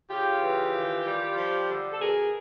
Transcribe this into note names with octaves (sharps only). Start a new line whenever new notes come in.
C#3 F4 G4
E3
D#3
G3
F3
D3
A4
B2 G#4 A#4